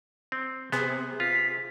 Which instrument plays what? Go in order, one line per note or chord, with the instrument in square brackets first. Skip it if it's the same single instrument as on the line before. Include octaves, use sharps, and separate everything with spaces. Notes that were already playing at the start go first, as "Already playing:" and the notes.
[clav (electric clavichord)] C4
[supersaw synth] C3 G#4 C5 [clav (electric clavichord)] B3
[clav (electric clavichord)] F4 [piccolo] B6